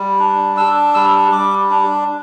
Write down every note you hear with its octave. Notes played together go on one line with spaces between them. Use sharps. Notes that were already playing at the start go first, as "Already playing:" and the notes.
Already playing: G3
D4
D4 E6
G3 E6
G3 D6
D4